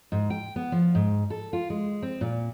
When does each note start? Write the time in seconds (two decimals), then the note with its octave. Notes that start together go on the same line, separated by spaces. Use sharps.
0.12 G#2
0.30 G5
0.56 B3
0.72 F3
0.95 G#2
1.30 A4
1.53 F4
1.70 G#3
2.02 C4
2.21 A#2